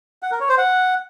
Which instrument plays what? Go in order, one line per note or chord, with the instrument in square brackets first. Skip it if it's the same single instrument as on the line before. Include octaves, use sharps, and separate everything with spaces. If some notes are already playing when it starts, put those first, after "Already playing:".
[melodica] F#5
A#4
C#5
C5
F#5